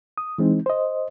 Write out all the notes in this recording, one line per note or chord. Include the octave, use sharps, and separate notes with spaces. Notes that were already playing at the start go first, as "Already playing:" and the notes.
D#6
E3 G#3 C4 D#4
C5 D#5